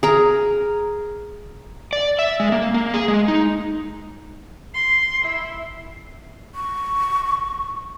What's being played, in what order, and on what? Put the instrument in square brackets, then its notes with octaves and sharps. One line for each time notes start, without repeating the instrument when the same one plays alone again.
[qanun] G#4 A#4
[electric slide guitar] D5
E5
G#3
A#3
A#3
G#4
G#3
D#4
[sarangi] C6 [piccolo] C7
[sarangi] E4
[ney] C#6